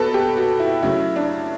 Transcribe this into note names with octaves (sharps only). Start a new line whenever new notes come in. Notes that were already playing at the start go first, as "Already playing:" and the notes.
Already playing: B2 A4 B4
G4
F#4
E4
C#3 F#3 A3 E4
D4